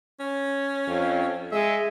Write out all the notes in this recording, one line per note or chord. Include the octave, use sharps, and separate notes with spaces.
C#4
F2
G#3 E5